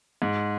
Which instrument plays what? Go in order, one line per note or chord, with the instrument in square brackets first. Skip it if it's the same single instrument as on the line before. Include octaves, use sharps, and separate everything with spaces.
[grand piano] G#2